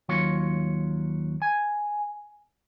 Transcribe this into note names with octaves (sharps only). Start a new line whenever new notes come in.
D#2 F#3 F4 C#5
G#5